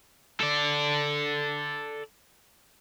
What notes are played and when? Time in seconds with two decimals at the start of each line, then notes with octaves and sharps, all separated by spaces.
0.41 A4 D5